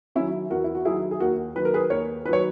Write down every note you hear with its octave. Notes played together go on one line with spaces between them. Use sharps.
D#3 F#3 C#4 E4
E2 F#4 A#4
E4
F#4
D#3 F#3 E4 G#4
G#4
D#2 F#4 A#4
D#3 F#3 B4
A#4
G#4 B4
D#2 A#4 C#5
D#3 F#3 B4 C#5